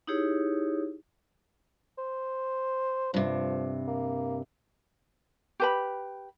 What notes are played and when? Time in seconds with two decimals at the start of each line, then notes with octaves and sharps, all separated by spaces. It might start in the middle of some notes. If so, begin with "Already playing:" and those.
0.07 D#4 E4 G4 G#4 C#5
1.98 C5
3.14 G2 C3 F3
3.88 A#3
5.60 G4 B4 B5